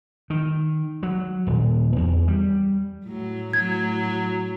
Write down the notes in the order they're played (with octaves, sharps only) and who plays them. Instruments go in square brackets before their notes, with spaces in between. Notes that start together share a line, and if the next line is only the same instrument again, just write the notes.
[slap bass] D#3
F#3
D#1
E2
G3
[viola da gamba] A2 F#3
[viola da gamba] A2 F#3 [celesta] G#6